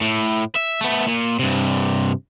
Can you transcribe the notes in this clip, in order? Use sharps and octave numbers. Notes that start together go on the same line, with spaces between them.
A2
E5
A3 B3
A#2
G2 C3